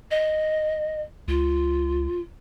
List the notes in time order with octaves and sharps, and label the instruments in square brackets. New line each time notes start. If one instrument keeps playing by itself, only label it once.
[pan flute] D#5
[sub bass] C#2 [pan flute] F4